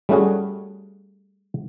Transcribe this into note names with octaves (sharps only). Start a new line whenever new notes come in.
G3 A3 C#4 F#4 G#4